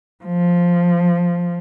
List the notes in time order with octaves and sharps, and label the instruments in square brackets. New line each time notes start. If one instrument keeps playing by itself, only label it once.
[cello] F3